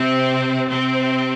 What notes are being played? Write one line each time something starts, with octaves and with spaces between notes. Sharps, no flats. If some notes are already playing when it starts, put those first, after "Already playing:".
Already playing: C3 C4
C3 C4